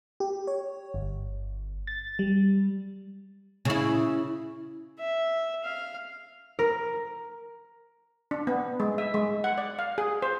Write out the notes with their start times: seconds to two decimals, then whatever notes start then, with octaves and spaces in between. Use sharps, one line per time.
0.20 G4
0.47 C#5
0.94 G1
1.87 A6
2.19 G3
3.65 C#3 E4
4.99 E5
5.64 F5
6.59 A#4
8.31 D4
8.47 B3
8.80 G#3
8.98 E5
9.14 G#3
9.44 F#5
9.58 D5
9.79 F5
9.98 G#4
10.22 C5